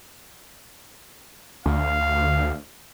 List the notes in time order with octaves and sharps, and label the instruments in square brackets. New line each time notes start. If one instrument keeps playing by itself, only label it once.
[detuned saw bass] D2 [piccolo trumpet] F5